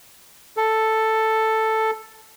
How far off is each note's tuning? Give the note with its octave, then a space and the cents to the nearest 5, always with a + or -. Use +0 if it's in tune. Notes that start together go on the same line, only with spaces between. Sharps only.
A4 +5